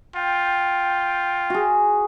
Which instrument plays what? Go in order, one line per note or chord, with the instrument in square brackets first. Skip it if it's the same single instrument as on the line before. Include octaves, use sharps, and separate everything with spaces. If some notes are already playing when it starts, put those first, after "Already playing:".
[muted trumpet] F4 [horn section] G5
[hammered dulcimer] F#4 G#4